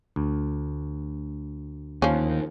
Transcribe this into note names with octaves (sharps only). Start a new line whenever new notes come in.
D2
D#2 F3 C#4